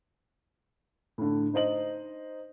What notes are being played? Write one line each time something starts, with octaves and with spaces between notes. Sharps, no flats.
A2 D3
D#4 C5 D#5 F#7